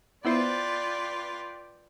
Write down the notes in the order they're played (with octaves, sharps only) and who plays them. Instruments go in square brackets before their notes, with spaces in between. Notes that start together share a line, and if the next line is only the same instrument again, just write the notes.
[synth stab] B3 E4 C5 [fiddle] F4 B4 [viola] D5 G5